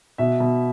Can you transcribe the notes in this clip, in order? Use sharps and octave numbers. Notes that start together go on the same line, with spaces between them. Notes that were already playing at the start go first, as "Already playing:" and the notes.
B2 E5
B2